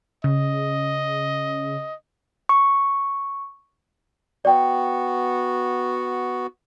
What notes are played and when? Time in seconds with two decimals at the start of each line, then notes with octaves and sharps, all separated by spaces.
0.24 C#3 D#5
2.49 C#6
4.45 B3 F#4 D5 G5